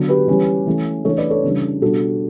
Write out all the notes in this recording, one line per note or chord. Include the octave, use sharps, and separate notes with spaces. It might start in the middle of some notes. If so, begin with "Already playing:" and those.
Already playing: D3 F#3 B3 D4
G4 B4
E3 G3 C#4
E3 A3 C#4
E3 A3 D4 A4 C#5
B4 D5
A4 C#5
C#3 E3 G3 D4
B2 G3 D4 F#4 A4